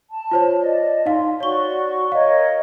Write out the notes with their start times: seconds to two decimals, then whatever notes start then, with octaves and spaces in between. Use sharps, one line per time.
0.10 A5
0.31 F4 C5 C#5
0.60 D5 D#5
1.06 D#4 F5 C6
1.40 F#4 C#5 D5 C#6 G7
2.12 A#4 C#5 D#5 F5